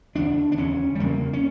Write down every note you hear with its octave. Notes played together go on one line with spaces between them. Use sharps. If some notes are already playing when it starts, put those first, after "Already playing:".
E2 D3 D4
D4
E2 D3 C#4
G3
E2 C#3 A#3
C#4